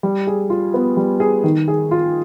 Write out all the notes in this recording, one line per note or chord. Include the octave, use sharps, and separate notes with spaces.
G3
G#4
F4
B3
G3
G#4
D#3
G#4
F4